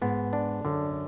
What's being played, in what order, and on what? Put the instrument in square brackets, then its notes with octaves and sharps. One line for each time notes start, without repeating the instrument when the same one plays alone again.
[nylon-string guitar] G#2 [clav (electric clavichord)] B3
[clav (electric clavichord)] D4
[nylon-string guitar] F#2 [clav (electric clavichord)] D3